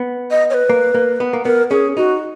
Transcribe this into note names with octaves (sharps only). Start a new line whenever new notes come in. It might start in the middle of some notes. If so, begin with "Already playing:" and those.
Already playing: B3
D#5
C#5
B4
A#3
A#3
B3
A#3
B3 A#4
C#4 G#4
D#4 F#4